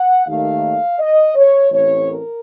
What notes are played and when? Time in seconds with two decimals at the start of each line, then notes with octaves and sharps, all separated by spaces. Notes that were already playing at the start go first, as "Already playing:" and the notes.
Already playing: F#5
0.27 D#2 D#3 A3 F5
0.99 D#5
1.35 C#5
1.71 A1 A2 A3 C4 C#5
2.08 A#4